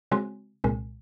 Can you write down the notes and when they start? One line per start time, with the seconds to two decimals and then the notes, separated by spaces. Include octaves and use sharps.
0.11 C#3 G#3 C4 F#4
0.64 C2 A#2 G#3